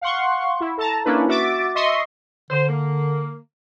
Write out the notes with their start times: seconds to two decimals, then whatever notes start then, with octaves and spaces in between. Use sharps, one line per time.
0.01 F5 F#5 C6 C#6
0.60 E4
0.77 A4 A5 A#5
1.05 A#3 C#4 D4 E4 B4
1.28 F#4 E5 D6 A6
1.75 D#5 E5 C6 C#6
2.50 D3 C5
2.69 A#3